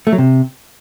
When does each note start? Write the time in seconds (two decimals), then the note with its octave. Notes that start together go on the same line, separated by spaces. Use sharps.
0.07 A3
0.13 F#3
0.18 C3